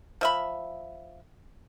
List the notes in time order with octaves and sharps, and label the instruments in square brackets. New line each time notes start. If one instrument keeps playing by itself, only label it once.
[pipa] F3 E5 B5